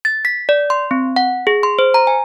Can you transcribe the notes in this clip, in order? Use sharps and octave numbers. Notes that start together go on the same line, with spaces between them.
A6
B6
D5
C6
C4
F#5
G#4
C6
C5
A#5
G#5